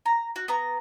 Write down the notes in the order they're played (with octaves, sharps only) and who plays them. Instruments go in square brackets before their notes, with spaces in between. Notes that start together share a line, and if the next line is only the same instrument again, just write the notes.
[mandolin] A#5
F#4
B3 A#5